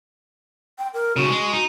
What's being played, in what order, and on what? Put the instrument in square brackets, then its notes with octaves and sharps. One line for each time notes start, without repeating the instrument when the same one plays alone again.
[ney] G5
A#4
[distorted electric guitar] D#2 C#3 [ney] F#4
[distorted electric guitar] G#3
D#4